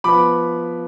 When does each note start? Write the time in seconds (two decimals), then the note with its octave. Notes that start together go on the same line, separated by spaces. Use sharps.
0.04 F3 B3 B5 D6